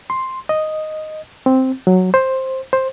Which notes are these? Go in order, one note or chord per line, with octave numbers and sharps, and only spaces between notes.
C6
D#5
C4
F#3
C5
C5